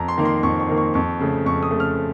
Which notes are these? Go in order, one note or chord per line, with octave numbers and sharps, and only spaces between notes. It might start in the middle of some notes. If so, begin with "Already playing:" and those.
Already playing: F2 A#5
C6
D#3 A#3
C6
F2 C#6
C#6
D#3 A#3
C#6
F2 C#6
C#3 A3
F2 C#6
D#6
A3
C#3 F6